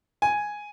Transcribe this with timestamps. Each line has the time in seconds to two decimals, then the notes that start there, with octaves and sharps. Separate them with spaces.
0.22 G#5